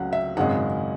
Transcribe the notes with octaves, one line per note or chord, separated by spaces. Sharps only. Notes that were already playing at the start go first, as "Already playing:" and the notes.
Already playing: C#2 C#3 F#3 A3 F#5
E5
G#1 F#2 C#3 G#3 F#5